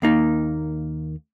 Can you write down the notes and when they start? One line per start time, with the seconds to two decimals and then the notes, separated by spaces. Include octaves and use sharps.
0.02 D#2 A#3 D#4